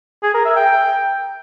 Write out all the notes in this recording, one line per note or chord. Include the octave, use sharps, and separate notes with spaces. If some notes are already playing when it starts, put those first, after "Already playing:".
G#4
A#4
E5
G5